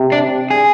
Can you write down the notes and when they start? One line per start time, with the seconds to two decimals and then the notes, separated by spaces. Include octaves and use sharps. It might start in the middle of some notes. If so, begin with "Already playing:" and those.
Already playing: C3
0.12 D4
0.51 G#4